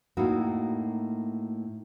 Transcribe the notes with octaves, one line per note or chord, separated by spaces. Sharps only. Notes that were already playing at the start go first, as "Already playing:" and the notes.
A2 A#3 D#4 E4 F#4